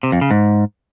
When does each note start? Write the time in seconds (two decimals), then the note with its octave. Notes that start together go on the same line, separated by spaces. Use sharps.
0.03 C3
0.12 F2
0.21 C#3
0.31 G#2